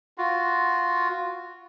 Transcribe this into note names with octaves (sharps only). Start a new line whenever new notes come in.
F4 F#4